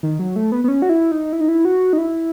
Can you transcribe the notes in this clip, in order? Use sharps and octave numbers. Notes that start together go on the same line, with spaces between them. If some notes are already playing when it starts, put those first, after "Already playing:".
D#3
F#3
A3
B3
B3
C#4
F#4
E4
D#4
E4
D#4
E4
F#4
D#4
E4